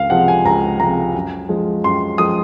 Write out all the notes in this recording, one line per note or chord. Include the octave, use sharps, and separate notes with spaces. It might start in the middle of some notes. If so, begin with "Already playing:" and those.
Already playing: C#2 F5
C3 F3 G#3 F#5
G#5
C#2 A#5
C3 F3 G#3 A#5
F#2
F3 G#3
F#2 C6
F3 G#3 D#6